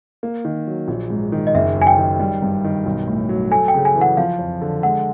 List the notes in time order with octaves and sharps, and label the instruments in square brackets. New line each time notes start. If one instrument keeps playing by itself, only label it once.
[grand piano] A#3
D#3
F#3
A#1
G#2
D#3
[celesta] D#5
[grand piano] F#1 [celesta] E5
[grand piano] F#2
[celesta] G#5
G5
[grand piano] D#3
G3
G2
D#3
B1
A2
F#3
[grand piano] A3 [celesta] G#5
[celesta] G5
[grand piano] C#3
[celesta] G#5
[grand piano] E3
[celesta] F#5
[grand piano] F3 [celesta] F5
[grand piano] F2
D3
[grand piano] G#3 [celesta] F#5